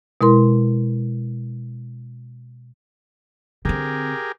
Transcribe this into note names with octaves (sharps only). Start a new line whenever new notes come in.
B2 G#3 E4 A#4 C6
D3 C4 G4 G#4 A#4